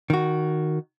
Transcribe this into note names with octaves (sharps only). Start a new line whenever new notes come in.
D#3 F#4